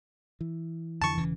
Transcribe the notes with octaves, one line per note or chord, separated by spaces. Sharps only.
E3
F2 D3 E3 A5 C#6
E1 C#3 E3